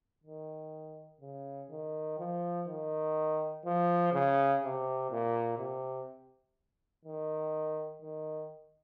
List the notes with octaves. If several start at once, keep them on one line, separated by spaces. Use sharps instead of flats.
D#3
C#3
D#3
F3
D#3
F3
C#3
C3
A#2
C3
D#3
D#3